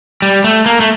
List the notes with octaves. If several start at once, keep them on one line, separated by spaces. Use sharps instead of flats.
G3
A3
A#3
A3